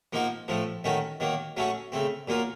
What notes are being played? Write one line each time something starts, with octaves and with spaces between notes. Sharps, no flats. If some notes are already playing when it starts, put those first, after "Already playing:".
F3 A#3 D#4 F#4
A2 F3 A3
D#3 A3 C#4 F#4
D#3 F#3 A#3
F#3 A3 C#4 F#4
C#3 A3 C4
A#2 F#3 A#3 F4